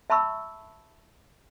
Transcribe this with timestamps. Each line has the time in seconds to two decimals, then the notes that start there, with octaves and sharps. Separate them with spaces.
0.10 E5 A5 B5 C#6 E6